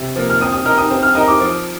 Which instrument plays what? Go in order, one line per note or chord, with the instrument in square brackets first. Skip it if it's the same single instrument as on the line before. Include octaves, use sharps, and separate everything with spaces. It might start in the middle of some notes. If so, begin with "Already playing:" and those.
Already playing: [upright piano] C3
F3 A#3
[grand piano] F6
[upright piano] C4 [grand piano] D#6
[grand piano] D#6
[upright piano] D#4 G4 A#4 D#5 [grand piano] F6
[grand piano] D#6
[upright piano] C4
[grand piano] F6
[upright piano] D#4 A#4 D#5 [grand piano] D#6
[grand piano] D6
[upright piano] F3